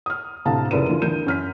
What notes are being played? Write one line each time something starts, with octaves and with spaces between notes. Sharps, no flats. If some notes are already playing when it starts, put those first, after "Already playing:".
D#6 F6
D2 A2 C3 F5 A5 A#5
F1 C#2 E4 A#4 B4 D#7
D3 E3 F4
D2 E3 A#4 G6 D#7
F#2 F6 B6